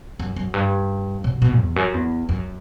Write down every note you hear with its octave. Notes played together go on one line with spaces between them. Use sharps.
F#2
F#2
G2
B2
B2
E2
F#2
E2
F#2